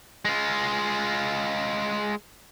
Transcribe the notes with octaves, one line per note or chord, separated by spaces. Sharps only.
G#3 F4